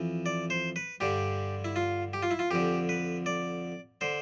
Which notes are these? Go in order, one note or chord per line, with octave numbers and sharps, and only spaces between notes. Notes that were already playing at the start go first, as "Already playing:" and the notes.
Already playing: F2 E3
D5
C5
B4
G2 D3 G4
E4
F4
G4
F4
E4
F4
F2 D3 G4
B4
D5
D3 C5